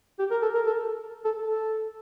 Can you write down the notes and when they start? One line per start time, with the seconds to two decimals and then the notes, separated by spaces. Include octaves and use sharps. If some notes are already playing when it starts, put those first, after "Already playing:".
0.19 G4
0.31 A#4
0.42 A4
0.55 A#4
0.66 A4
1.25 A4
1.48 A4